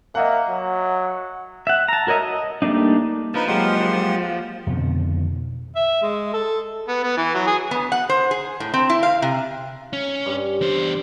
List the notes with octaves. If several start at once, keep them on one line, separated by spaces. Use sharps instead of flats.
A#3 D#5 E5 F#5
F#3
E5 F#5
A5 A#5
F#4 A#4 C#5 D#5 E5
D#5
G3 A3 A#3 D4 D#4
F3 D#4 B4
F#3 G#3 A#3 G4 F#5 C6
F2 B2 D3 D#3
E5
G#3
A4
B3
B3
E3
F#3
G#4
B3
F#5
C5
G#4
A2
C4
E4
F5
C3
C#4
G2
E2 C5